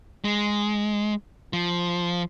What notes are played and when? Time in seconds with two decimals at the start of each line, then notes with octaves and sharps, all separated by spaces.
0.25 G#3
1.53 F3